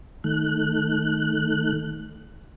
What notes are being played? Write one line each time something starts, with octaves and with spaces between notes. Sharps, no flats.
D#3 A3 F#6